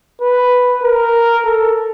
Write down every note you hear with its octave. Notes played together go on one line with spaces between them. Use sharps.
B4
A#4
A4